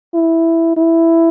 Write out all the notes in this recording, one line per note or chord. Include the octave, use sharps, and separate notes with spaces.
E4
E4